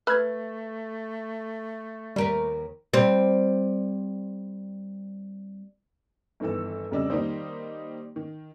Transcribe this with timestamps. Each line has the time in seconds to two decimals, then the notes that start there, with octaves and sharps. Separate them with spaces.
0.07 A3 B4 B5 E6 F6 G#6
2.16 D#2 G3 A#4 B4
2.93 G3 C4
6.40 G1 D#3 E3 A4 E6
6.91 F1 C#3 G3 D4 D#5 E6
7.10 D#3 G3 A#3 D#4 C5
8.16 D#3